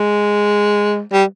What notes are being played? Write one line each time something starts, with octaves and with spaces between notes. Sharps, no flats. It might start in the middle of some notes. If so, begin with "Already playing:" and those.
Already playing: G#3
G3